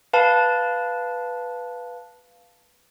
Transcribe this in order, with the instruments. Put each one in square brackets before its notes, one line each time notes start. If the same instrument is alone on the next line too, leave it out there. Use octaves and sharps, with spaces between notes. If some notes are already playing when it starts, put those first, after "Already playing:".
[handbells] B4 F5 A5